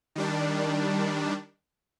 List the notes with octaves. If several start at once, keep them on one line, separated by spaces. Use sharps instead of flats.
D#3 G3 D4